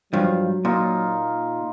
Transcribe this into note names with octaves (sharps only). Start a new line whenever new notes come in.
G2 F3 F#3
A#2 D#4 F4